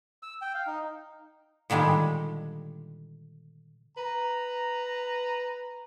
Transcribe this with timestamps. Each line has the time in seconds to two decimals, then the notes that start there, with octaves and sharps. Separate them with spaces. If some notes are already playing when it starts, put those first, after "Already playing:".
0.23 E6
0.42 G5
0.54 F5
0.67 D#4
1.70 A#2 D3 D#3 G3 G#3
3.97 B4 A#5